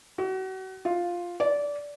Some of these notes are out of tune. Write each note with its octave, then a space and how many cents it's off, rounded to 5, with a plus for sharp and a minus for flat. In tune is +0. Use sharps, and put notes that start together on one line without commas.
F#4 +35
F4 +5
D5 -20